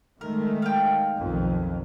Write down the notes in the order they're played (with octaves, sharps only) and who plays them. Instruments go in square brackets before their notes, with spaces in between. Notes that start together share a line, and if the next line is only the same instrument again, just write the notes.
[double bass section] D#3 G#3 A3 [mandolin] A#4
[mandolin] F5 G5
[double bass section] B1 F2 D#3